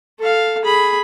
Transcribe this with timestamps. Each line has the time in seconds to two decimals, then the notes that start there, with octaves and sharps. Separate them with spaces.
0.20 A4 F5
0.64 G#4 B5